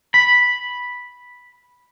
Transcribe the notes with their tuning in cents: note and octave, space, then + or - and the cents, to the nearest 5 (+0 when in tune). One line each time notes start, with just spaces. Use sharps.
B5 -5